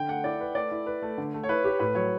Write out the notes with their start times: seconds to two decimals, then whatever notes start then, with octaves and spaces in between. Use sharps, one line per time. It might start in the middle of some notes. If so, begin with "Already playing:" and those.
Already playing: D3 G5
0.08 A3 F#5
0.24 E4 D5
0.40 B4
0.55 A3 D5
0.72 E4
0.86 B4
1.02 A3
1.18 D3
1.34 A3
1.44 C#5
1.49 E4 B4
1.64 G4
1.79 A2 B4
1.95 F#3 C#5